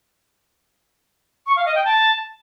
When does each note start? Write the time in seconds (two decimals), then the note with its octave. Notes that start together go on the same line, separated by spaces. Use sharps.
1.47 C#6
1.56 F5
1.66 D#5
1.75 G5
1.85 A5